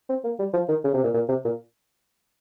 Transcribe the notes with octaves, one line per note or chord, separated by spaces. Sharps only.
C4
A#3
G3
F3
D#3
C#3
C3
A#2
A#2
C3
A#2